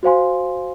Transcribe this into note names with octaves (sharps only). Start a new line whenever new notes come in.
F#4 C5 F5 G#5 C6